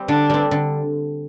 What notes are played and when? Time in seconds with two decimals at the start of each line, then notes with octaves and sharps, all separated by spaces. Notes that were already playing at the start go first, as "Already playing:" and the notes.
Already playing: G3 C4
0.08 D3 D4
0.30 G3 C4
0.51 D3